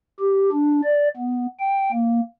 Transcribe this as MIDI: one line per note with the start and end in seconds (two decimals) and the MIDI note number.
0.19 0.49 67
0.52 0.80 62
0.84 1.09 74
1.17 1.46 59
1.60 1.91 79
1.92 2.21 58